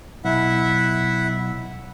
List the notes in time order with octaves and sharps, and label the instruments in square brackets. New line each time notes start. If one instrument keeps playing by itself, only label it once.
[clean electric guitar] B1 [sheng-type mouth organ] E4 E5 F#5